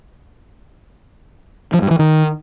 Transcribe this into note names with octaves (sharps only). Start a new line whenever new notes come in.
F3
G2
E3
D#3